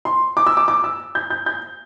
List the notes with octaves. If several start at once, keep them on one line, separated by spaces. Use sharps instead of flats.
C6
D6
E6
D6
D6
E6
G6
G6
G6